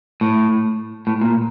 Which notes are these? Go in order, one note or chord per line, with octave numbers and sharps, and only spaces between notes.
A2
A2
A#2